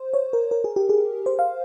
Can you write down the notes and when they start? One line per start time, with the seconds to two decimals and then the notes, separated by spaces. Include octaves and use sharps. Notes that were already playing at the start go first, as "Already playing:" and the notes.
Already playing: C5
0.14 C#5
0.33 A#4
0.51 A#4
0.64 G#4
0.76 G4
0.89 G#4
1.26 C5
1.39 F5